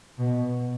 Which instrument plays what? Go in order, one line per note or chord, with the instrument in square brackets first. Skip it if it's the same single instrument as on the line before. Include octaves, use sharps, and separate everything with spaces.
[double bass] B2